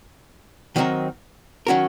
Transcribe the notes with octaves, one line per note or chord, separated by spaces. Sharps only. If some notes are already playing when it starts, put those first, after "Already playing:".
D#3 F#3 C4 D#4 A#4
D#3 F#3 C#4 F#4 A#4